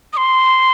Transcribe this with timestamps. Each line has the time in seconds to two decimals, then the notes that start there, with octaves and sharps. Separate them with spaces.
0.13 D#6
0.17 C6